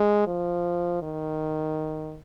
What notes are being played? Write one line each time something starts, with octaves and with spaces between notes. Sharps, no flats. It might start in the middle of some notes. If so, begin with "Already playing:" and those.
Already playing: G#3
F3
D#3